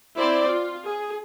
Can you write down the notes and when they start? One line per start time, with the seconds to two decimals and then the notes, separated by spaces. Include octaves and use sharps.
0.18 C4 E4 C5 D5
0.48 F4
0.87 G#4